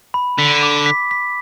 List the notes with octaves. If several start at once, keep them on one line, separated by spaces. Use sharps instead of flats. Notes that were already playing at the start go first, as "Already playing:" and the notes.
B5
D3 B6
D6
B6
B6